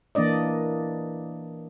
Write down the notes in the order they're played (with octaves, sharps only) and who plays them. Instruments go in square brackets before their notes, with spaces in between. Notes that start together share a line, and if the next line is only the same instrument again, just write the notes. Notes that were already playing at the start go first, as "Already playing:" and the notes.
[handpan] E3 A#3 D4 D5 D#5